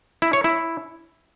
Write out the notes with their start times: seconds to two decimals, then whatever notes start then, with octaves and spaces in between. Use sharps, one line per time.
0.22 E4
0.33 C#5
0.44 E4